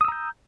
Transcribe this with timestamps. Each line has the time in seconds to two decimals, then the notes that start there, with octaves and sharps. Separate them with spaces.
0.01 D#6
0.05 E6
0.08 A#5
0.12 G6